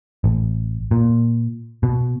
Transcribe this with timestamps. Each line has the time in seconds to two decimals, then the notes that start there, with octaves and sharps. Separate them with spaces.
0.24 A1
0.91 A#2
1.83 B2